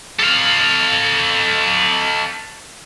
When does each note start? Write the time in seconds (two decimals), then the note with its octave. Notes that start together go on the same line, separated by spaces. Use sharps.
0.19 A4 F5